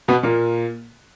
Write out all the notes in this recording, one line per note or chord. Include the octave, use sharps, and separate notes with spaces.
B2 B3
A#2 A#3